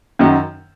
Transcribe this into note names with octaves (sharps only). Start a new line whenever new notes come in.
F#2 D#3 F#3